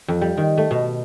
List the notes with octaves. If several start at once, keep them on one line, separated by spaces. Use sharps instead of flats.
F2
G3
D#3
A3
B2